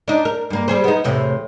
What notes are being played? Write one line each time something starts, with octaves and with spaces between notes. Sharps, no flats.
D4 D#4
A#4
G2 A#3
G3 G#4 C5
B3 D#4
E2 A2 C3